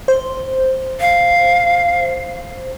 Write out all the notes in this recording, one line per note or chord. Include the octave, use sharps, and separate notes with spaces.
C5
F5